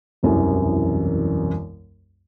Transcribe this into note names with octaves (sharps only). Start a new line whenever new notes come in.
E1 C2 F#2 E3 D4